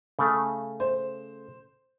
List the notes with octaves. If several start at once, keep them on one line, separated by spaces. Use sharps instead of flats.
C#3 A3
C5